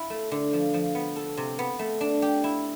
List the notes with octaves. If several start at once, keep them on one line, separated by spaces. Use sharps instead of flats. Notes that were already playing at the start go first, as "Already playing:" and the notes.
Already playing: E4
A3
D3
F3
F3
B3
A4
C3
B3
A3
D4
G4
E4